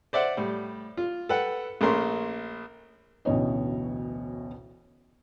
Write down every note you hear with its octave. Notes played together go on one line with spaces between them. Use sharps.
C5 D5 E5 F#5
A2 G3
F4
A4 B4 F#5 G5
A#1 A3 C#4 A#4 C6
A1 D2 B2 C#5 D#5